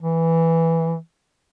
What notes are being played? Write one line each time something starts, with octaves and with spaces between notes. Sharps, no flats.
E3